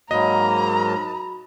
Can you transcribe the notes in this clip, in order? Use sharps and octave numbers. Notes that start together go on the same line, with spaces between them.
G#2 F#3 A#3 F#4 D#5 A#5 B5